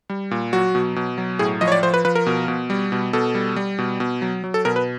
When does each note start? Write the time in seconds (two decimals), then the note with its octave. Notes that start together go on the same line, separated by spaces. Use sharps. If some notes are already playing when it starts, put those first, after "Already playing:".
0.10 G3
0.31 A#2
0.53 F#3 F#4
0.75 B2
0.96 B2
1.18 F#3
1.39 A2 G#4
1.61 F3 D#5
1.68 C#5
1.72 D5
1.83 F3 C5
1.94 B4
2.05 F3 B4
2.15 A#4
2.26 B2
2.48 B2
2.70 G3
2.92 B2
3.13 B2 A4
3.35 G3
3.56 G3
3.79 B2
4.00 B2
4.22 F#3
4.44 F#3
4.54 A4
4.65 B2 A#4
4.76 B4